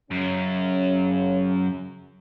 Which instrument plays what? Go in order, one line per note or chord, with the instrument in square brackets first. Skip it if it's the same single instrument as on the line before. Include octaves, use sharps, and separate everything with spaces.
[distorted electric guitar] F#2 [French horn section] C#3 C#4